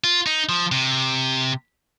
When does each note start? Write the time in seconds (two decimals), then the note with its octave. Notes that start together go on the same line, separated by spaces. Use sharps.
0.04 F4
0.26 D#4
0.49 F3
0.72 C3